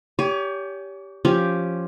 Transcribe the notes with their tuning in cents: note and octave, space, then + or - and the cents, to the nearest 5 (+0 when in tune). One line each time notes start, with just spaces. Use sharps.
G4 +0 C#5 +35 G#5 +0
F3 +0 C#4 +0 G4 +0